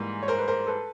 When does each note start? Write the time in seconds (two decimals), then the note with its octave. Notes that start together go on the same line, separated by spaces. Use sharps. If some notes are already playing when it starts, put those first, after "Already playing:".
Already playing: G#2 E3 G3 A#3
0.22 C#5
0.28 A#4 C5
0.38 B4
0.48 A#4 C5
0.66 A4 B4